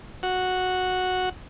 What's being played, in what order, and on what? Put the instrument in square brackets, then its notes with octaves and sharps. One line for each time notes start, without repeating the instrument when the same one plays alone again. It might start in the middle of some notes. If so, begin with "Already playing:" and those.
[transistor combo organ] F#4